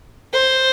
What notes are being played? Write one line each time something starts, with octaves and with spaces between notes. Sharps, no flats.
C5